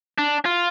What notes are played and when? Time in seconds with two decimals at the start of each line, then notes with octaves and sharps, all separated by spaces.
0.18 D4
0.45 F4